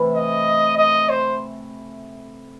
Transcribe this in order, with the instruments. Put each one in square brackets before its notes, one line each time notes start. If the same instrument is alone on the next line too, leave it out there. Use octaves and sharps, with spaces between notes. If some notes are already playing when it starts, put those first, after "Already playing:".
Already playing: [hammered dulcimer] C3 E3 A3 E4
[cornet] D#5
D#5
C5